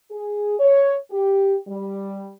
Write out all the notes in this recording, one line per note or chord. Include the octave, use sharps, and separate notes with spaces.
G#4
C#5
G4
G3